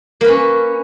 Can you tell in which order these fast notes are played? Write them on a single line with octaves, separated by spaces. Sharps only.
A#3 B4 C#4